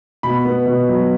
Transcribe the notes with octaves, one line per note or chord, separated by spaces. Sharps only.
B2 B5
B3
B2
F#3